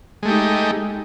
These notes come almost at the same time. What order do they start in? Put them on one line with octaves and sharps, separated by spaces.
G#3 A3 G4 D#4